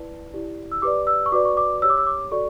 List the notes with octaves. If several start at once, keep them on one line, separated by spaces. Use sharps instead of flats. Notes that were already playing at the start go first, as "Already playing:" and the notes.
Already playing: E4 B4 D5 A5
E4 G4 D5
E6
G4 B4 D5 D6
E6
C#6
F#4 B4 D5 D6
C#6
D6
G4 C#5 E6
D6
E6
D6
F#4 A4 D5 C#6